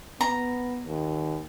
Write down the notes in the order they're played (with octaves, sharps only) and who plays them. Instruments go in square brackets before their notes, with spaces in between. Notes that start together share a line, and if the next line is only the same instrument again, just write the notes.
[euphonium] B3 [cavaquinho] A#5
[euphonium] D#2